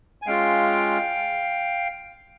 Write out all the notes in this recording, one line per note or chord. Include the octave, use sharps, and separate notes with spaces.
G#5
G#3 C#4 F4 F5 G5